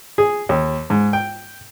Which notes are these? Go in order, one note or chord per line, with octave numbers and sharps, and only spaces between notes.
G#4
D#2
G#2
G5